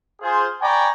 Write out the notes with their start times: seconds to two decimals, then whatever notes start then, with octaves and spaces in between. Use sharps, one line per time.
0.22 F4 G#4 C5
0.61 D5 G5 G#5 A#5 B5 C#6